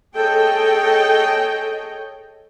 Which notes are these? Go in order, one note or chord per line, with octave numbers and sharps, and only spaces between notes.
G#4 A4 C#5 D#5 G5